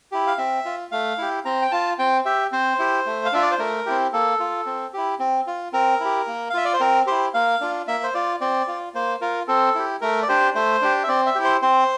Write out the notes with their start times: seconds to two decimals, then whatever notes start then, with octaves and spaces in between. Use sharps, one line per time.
0.12 E4 G4
0.27 F5
0.38 C4 E5
0.65 F4
0.92 A3 F5
1.18 E4 G4
1.45 C4 A#5
1.62 G5
1.72 F4 A5
1.99 C4 G5
2.25 G4 E5
2.52 C4 C5
2.79 E4 G4
3.06 A3
3.25 F5
3.33 D4 F4 E5
3.43 D5
3.51 C5
3.59 A3 A#4
3.86 C4 E4 G4
4.13 A#3 A4
4.40 F4
4.66 C4
4.93 E4 G4
5.19 C4
5.47 F4
5.73 C4 A#4
6.00 E4 G4
6.27 A#3
6.50 F5
6.54 F4 E5
6.65 D5
6.73 C5
6.80 C4 A#4
7.07 E4 G4 C5
7.34 A#3 F5
7.61 D4 F4
7.88 A#3 E5
8.04 C5
8.14 F4 D5
8.41 C4 D5
8.68 F4
8.94 A#3 C5
9.21 F4 A#4
9.48 C4 A4
9.75 E4 G4
10.01 A3 A#4
10.23 D5
10.29 D4 G4 C5
10.55 A3 C5
10.82 D4 G4
11.04 E5
11.08 C4 D5
11.26 E5
11.35 E4 G4
11.44 C5
11.62 C4 C5